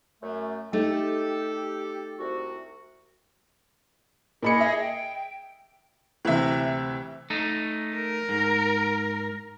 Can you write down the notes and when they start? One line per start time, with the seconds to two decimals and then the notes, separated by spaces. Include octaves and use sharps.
0.23 F#2 A3
0.73 A3 D#4 G4 A4
2.19 C2 F#4
4.43 A#2 G#4 D#5 B5 C#7
4.60 E5
4.79 G5
6.25 D2 C3 E3 E5
7.30 A3 D#4
7.97 A#4
8.29 G#2